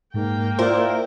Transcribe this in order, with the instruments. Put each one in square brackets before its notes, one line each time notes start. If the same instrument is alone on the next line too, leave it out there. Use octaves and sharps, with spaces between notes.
[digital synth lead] G#2 [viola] A#3 G5
[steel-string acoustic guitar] E4 A#4 [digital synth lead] F4 [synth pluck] C5 D5